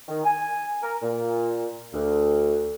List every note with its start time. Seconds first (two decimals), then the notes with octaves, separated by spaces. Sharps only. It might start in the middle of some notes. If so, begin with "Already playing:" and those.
0.08 D#3
0.24 G#5
0.83 A#4
1.03 A#2
1.94 D2